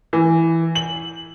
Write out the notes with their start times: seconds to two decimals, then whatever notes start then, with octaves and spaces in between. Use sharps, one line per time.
0.13 E3
0.75 F#7